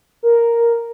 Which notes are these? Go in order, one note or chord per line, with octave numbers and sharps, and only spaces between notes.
A#4